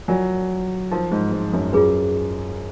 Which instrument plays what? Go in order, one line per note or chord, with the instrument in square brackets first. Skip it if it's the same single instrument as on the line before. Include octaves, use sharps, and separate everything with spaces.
[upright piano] F#3 [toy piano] F4 A#4 D5 G#5
[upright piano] F3 [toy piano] D#4 A#4 F5
[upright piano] G#2
G#2
F#2
[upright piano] F#2 [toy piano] F4 G#4 B4